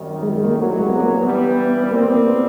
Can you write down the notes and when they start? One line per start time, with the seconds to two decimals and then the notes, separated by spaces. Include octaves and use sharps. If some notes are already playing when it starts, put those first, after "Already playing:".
Already playing: G#1 F#2 D#3 G3
0.23 G#3
0.33 G#3
0.45 A#3
0.56 C2 A#2 F#3 A3
0.79 G#3
0.90 B3
1.00 A#3
1.12 B3
1.23 G2 E3 G3 B3
1.91 C2 A#2 G3 A#3 C4
2.03 B3
2.15 A#3
2.28 B3